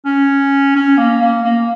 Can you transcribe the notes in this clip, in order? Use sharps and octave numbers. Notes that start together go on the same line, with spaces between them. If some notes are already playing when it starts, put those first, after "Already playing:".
C#4
C#4
A#3
A#3
A#3